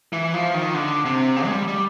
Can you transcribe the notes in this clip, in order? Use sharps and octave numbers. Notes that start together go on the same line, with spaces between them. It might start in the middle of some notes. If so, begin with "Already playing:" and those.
E3
F3
D#3
D3
C3
C#3
G#3
G3
G3